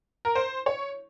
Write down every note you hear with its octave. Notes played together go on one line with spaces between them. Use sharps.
A#4
C5
C#5